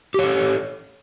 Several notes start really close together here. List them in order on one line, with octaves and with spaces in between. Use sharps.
G4 C#5 A4